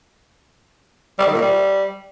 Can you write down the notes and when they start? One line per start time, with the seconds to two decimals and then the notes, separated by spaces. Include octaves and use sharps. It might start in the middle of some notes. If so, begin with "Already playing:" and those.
1.19 G3
1.26 D#3
1.34 A#2
1.41 G3